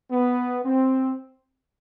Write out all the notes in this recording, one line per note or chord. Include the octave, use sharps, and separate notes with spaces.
B3
C4